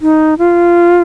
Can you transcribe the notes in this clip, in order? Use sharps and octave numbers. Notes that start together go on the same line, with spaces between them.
D#4
F4